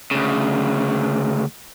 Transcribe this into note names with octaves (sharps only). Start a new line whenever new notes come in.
D2 C#3